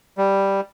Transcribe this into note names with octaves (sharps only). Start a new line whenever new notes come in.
G3